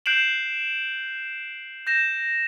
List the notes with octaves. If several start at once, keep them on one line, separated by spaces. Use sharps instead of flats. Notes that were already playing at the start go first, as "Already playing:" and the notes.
F#6 G6 C7 D7 E7 F#7
G6 A#6 E7